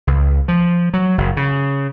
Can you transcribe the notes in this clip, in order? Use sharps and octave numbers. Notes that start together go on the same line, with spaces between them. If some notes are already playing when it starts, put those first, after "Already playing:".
C#2
F3
F#3
F#1
C#3